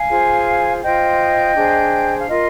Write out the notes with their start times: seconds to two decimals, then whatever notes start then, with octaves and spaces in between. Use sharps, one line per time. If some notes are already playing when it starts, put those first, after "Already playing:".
Already playing: F5 G#5
0.08 F4 G#4 C5
0.81 F4 C5 D#5 G5
1.55 D4 G#4 C5
2.20 F5
2.28 F4 A#4 D#5